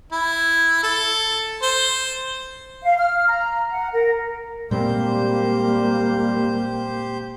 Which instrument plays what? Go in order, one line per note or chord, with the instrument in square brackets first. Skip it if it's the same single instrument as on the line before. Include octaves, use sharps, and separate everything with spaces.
[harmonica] E4
A4
C5
[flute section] F5
F6
A#5
F#5
A#4
[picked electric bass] A#2 G#3 C4 [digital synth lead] G3 [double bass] A#3 [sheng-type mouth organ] G4 C5 G6